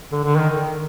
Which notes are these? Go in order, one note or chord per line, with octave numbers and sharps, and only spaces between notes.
D3
D3
D#3